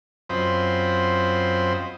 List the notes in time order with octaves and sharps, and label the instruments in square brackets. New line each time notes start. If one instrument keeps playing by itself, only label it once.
[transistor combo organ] F#2 C4 F4 C5 D#5 B5